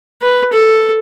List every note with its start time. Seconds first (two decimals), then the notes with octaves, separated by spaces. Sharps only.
0.22 B4
0.53 A4